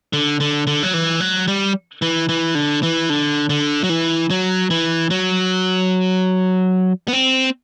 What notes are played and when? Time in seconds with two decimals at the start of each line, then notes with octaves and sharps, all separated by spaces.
0.13 D3
0.40 D3
0.67 D3
0.83 F#3
0.94 E3
1.20 F#3
1.48 G3
2.02 E3
2.29 E3
2.55 D3
2.83 E3
3.10 D3
3.49 D3
3.84 F#3
3.89 E3
4.30 F#3
4.70 E3
5.10 F#3
7.08 B3
7.13 C4